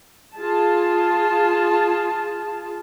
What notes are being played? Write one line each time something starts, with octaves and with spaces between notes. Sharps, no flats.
F4 G#4 A5